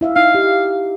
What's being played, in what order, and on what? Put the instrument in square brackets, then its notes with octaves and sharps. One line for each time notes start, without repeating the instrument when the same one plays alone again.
[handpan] E4 E5 F5
[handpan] D#4 [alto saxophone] F5
[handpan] G4